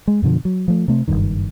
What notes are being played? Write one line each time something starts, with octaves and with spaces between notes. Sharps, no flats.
G#3
F#2 B2 D3 F3
F#3
F3 A3
C3 A3 C4
F#1 C2 G2 D#3